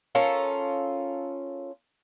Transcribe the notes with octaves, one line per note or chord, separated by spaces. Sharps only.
C#4 F4 A4 A#4